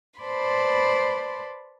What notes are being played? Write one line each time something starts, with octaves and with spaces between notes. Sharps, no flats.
B4 C5 D5 A5 B5 C6